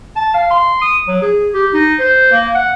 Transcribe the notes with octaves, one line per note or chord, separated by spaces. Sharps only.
A5
F5
C6
D#6
F#3
G#4
G4
D#4
C5
A#3
F#5